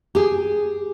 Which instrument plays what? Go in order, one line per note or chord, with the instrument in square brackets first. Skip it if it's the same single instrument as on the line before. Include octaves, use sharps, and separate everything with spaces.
[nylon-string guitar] G4 G#4